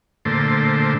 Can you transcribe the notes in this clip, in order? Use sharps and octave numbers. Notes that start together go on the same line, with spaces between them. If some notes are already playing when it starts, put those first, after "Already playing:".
A#2 D3 A3 C5